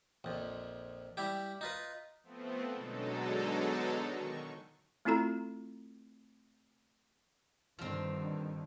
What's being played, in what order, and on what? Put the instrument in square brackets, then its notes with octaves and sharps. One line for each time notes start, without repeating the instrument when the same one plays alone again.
[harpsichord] A#1 F2
G3 E4 G4
D#4 F4 B4
[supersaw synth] F3 A3 B3 C4
B2 D3 F#3 G#3 D#4 A4
D#3 C#6
[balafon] A3 C4 E4 F4 A4 A#5
[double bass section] G2 D3 D#3 [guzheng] F3 C4